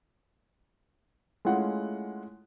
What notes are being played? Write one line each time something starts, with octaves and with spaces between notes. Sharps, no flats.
G#3 A3 C#4 E4 F4 F#5